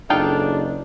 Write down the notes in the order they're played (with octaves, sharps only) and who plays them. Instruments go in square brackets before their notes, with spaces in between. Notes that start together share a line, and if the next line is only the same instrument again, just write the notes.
[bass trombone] F#1 [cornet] D4 [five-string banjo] D#4 F4 G5 [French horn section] G#4 A4 D#5